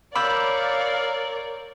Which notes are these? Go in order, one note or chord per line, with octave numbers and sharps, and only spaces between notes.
A#4 C#5 D5 F5 B5 D6 E6 G6